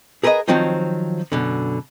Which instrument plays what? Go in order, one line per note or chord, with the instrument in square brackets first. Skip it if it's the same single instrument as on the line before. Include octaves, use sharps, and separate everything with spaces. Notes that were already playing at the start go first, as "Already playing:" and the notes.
[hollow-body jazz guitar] G#4 A#4 B4 C#5 D#5
D#3 F3 F#3 C4 D#4 F4
F#2 B2 D3